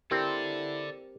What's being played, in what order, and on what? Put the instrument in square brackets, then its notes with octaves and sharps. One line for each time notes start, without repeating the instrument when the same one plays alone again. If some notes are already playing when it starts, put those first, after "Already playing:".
[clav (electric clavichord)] C4 [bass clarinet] E4 [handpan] G4 A#4 [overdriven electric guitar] A4 D5